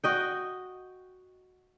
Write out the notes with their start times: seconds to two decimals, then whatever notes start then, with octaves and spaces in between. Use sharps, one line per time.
0.04 F#4 D#5 G5